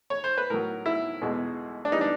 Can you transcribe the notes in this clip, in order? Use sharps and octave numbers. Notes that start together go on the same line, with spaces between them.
C#5
C5
B4
A2 F#3 A#4
E4
E2 B2 G#3
D4
E3 G3 D#4
D4